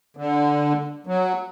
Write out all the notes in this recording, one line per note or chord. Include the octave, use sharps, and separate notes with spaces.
D3
F#3